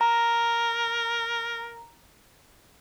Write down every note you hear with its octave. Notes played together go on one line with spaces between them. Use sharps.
A#4 A#5